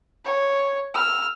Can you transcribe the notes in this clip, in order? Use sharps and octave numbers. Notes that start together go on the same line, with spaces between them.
C#5
E6 F6